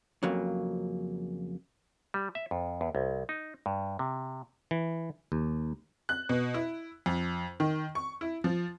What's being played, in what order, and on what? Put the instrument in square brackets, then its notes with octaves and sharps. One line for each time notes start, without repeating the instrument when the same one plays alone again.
[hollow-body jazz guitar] F2 C#3 F#3 A#3
[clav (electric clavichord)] G3
E5
F2
E2
C2
D#4
G2
C3
E3
D#2
[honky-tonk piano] F#6
B2
E4
F2
D#3
C#6
E4
F3